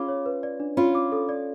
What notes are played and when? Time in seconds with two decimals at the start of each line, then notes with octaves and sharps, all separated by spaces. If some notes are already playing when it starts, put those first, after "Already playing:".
Already playing: C#4 F4 G#4 B5 D6
0.08 C#5
0.26 B4
0.43 D5
0.60 D4
0.77 C#4 F4 B5
0.95 D6
1.12 A4
1.29 D5